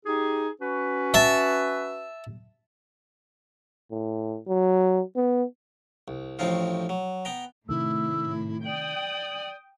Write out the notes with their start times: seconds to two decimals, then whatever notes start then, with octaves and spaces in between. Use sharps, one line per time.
0.06 D#4 G4 G#4
0.61 C#4 F#4 B4
1.14 E5 A5
3.91 A2
4.48 F#3
5.16 B3
6.08 C2
6.39 A1 A2 F3 C4 D#4 F4
6.89 F#3
7.25 B3 G5 A#5
7.69 A2 C3 D#3 A3 E4 E6
8.65 D5 G5 D#6 F#7